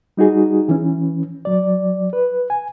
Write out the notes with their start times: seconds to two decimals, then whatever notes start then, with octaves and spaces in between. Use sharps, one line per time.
0.17 G3 D#4 F#4 G#4
0.69 E3 C#4
1.45 F#3 D5
2.13 B4
2.50 G#5